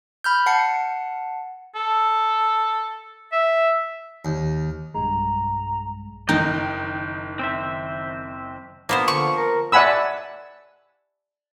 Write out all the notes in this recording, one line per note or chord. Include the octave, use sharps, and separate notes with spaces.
B5 F6 G6
F#5 A5 C7 C#7
A4
E5
D#2
B1 G2 G#3 A#5
F#1 D#3 D#4 G5
C4 C5 E5
F3 A#3 B3 C5
D3 C#6
A#4
D5 E5 F#5 G#5 B5 E6